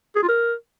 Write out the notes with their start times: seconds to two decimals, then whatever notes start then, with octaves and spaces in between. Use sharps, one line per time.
0.16 G#4
0.22 F4
0.29 A#4